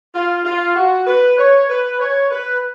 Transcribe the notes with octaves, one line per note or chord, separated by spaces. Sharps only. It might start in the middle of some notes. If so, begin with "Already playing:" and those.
F4
F4
F#4
B4
C#5
B4
C#5
B4